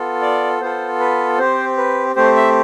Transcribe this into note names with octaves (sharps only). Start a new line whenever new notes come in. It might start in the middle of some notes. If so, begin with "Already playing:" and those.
Already playing: B3 F4 A4
D5
B3 F4 A4 C5
B4
C4 G4 C5
B4
A3 C4 G4 C5
E5